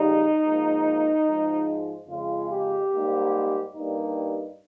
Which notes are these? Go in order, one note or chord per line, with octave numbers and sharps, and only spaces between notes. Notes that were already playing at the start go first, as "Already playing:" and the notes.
Already playing: F2 C#3 G3 D#4
G#2 F3 A#3
G#2 F3 G#3
F2 C#3 G#3 F4
G4
G#2 G3 A#3
G2 G3 A#3 D#4